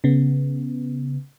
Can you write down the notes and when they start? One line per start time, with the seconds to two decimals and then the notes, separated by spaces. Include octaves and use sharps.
0.04 C#3 B3